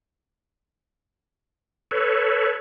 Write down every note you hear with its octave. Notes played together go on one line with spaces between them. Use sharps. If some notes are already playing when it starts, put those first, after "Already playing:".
A4 B4 C#5